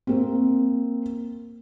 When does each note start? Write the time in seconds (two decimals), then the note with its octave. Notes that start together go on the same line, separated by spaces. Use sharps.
0.07 A#3 C4